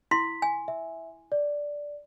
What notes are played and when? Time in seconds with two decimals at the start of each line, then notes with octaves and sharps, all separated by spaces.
0.11 E4 C6 B6
0.42 G#5
0.68 E5
1.32 D5